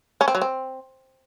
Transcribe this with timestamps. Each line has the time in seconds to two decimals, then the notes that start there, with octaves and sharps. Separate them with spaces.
0.21 C#4
0.28 C4
0.35 F#3
0.42 C4